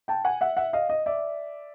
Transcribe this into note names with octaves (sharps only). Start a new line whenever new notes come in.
G5 A5
F#5 G#5
E5 F#5
E5 F#5
D#5 F5
D#5
D5 E5